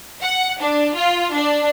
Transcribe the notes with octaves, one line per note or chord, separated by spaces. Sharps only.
F#5
D4
F4
D4